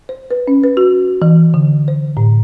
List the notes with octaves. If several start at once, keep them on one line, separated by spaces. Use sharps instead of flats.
C5
B4
C#4
B4
F#4
E3
D3
C5
A2